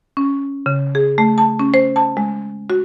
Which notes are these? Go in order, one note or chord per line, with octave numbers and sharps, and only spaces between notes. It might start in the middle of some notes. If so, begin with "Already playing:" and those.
C#4
C#3
G#4
A3
A5
C#4
C5
A5
G#3
F#4